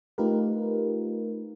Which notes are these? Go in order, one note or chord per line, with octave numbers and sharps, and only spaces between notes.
A3 D#4 F4 G4 A#4 B4